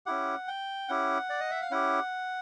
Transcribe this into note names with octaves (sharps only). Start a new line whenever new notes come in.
C#4 E4 G4 F#5
G5
C#4 E4 G4 F#5
D5
D#5
E5
F5
C#4 E4 G4 F#5